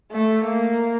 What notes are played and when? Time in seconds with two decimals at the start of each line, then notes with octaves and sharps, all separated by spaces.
0.12 A3
0.45 A#3